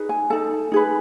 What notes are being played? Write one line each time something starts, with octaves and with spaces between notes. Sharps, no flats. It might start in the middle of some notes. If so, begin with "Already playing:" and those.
Already playing: D#4 G#4 B4
G#5
D#4 A4 A5
D#4 G#4 B4